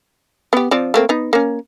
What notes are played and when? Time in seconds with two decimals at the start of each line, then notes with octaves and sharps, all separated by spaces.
0.53 B3 G4
0.71 F3 C4 D5
0.94 A3 A#3 C4
1.09 B3 D#4
1.33 A#3 C#4